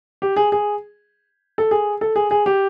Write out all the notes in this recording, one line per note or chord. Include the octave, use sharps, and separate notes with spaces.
G4
G#4
G#4
A4
G#4
A4
G#4
G#4
G4